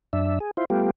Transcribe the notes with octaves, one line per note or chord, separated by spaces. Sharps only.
F#2 D4 E5
G#4
E4 F4 C5
G3 A3 B3 F4 G4